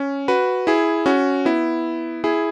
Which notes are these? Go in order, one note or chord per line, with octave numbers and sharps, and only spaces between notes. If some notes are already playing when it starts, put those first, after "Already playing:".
Already playing: C#4
F#4 B4
E4 G#4
C#4 F#4
B3 E4
E4 G#4